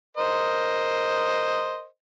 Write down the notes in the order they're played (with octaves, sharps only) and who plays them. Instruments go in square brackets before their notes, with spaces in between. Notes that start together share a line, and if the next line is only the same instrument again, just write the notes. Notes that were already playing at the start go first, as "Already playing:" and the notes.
[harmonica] A#4 C5 D#5